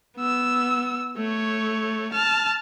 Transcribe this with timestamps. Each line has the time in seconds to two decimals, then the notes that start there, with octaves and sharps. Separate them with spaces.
0.17 B3 E6
1.17 A3 C#5
2.13 A5 F6